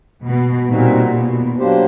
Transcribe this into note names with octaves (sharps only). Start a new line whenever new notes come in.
B2
A#2 G3 C4 D#4 F#4
B2
F#3 A#3 D4 G4 C5